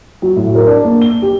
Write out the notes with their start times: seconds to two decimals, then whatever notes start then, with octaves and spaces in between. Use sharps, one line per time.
0.22 F#3
0.36 A2
0.55 A#4
0.67 D4
0.84 A#3
1.02 G7
1.22 G4